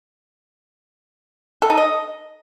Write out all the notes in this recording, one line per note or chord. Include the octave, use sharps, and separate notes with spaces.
A4
D#4
D#5